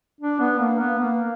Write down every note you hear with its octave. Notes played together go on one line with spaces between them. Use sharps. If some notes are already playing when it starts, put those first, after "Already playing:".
D4
B3
A#3
B3
A#3